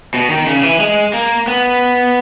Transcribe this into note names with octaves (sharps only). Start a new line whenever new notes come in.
B2
D#3
C#3
E3
G#3
A#3
B3